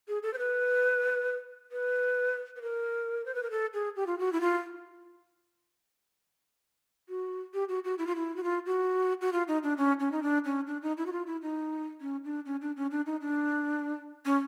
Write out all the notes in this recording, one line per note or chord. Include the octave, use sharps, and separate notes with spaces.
G#4
A4
C5
B4
B4
B4
A#4
C5
B4
A#4
A4
G#4
G4
F4
F#4
E4
F4
F#4
G4
F#4
F#4
E4
F4
E4
F#4
F4
F#4
F#4
F4
D#4
D4
C#4
C#4
D#4
D4
C#4
D4
D#4
E4
F#4
F4
E4
D#4
C#4
D4
C#4
D4
C#4
D4
D#4
D4
C#4